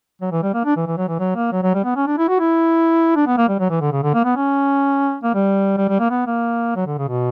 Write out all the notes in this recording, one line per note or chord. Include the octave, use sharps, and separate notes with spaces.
F#3
E3
G3
A#3
D4
E3
E3
F#3
E3
F#3
A#3
F#3
F#3
G3
B3
C#4
D4
E4
F#4
E4
D4
B3
A#3
G3
F#3
E3
D3
C#3
D3
A#3
B3
C#4
A#3
G3
G3
G3
A#3
B3
A#3
F#3
D3
C#3
B2